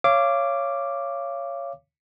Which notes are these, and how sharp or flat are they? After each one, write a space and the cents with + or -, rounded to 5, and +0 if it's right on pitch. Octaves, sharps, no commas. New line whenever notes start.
C#5 +0 F5 -30 D6 +0